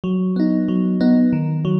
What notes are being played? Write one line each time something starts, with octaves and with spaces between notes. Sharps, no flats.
F#3
B3 D#4
F#3
B3 D#4
D#3
F#3